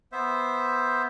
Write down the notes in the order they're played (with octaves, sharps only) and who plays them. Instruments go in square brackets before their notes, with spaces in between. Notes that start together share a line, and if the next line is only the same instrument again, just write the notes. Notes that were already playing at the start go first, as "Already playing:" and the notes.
[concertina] B3 C5 E5